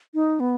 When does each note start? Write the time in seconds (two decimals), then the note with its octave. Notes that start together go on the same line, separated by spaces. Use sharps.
0.14 D#4
0.40 B3